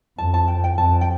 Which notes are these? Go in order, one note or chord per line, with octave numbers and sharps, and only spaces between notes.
F2 A5
A5
G5
G5
F2 A5
G5